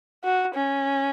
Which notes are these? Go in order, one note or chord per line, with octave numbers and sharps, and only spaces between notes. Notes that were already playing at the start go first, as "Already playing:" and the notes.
F#4
C#4